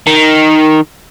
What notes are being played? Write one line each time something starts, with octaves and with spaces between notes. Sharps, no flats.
D#3